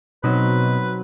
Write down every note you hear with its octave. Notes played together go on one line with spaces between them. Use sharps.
B2 F#3 C4 D#4 B4